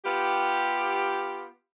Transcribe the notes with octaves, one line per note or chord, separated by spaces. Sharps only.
B3 F4 G4